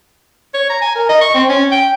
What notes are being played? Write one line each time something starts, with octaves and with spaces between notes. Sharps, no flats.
C#5
A#5
G#5
A#4
D#5
C#6
C4
C#4
G5